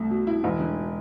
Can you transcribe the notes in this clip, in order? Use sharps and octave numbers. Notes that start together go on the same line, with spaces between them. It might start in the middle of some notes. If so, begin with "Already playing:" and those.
Already playing: C2 A3
B2
E4
E1
D3